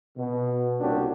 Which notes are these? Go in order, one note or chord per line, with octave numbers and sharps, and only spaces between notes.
B2
C2 A#2 C#4 D4 F#4 G4